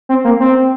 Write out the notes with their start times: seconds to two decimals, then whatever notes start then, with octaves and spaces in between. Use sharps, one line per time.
0.09 C4
0.24 A#3
0.40 C4